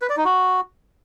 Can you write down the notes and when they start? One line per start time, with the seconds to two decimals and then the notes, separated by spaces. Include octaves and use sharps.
0.02 B4
0.09 D5
0.17 D#4
0.25 F#4